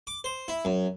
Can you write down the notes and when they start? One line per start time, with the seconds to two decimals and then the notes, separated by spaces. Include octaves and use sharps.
0.07 D6
0.24 C5
0.48 E4
0.65 F#2